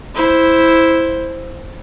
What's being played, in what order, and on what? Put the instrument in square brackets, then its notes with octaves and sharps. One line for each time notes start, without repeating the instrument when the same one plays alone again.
[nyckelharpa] E4 C5